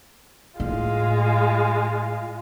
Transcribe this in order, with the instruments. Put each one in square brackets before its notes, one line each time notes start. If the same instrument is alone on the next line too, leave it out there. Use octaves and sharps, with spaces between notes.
[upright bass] A2 [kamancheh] G#3 F4